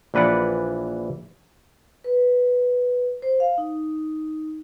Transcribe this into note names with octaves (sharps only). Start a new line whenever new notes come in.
A#1 E3 B4 D5 F#5
B4
C5
F5
D#4